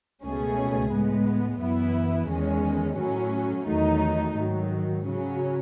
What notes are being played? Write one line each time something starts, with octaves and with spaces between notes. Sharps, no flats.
C#2 B2 A3 C#4 G#4
A2 G#3 B3
F#2 E3 B3 E4
E2 D#3 G#3 C#4
A2 F#3 C#4
E2 D#3 F#3 A3 D#4
G#2 D#3 F#3
C#3 F#3 C#4